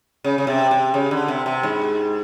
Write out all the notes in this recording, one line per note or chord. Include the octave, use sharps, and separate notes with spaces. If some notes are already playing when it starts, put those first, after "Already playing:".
C#3
C#3
C3
C3
C#3
D3
C3
C3
G#2